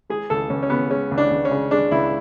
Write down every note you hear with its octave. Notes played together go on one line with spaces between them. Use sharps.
G#3 G#4
C#2 A4
C#2 C#4
C#4
C#3 B3
G#3 C#4
C#2
D4
C#2
C#4
C#3
G#3 D4
C#2 E4